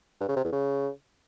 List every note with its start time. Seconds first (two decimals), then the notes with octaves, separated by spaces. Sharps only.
0.20 G2
0.28 C#3
0.36 C3
0.44 E2
0.52 C#3